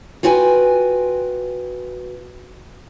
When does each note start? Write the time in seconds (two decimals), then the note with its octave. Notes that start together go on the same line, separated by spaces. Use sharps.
0.23 F4 F#4 B4 G5 G#5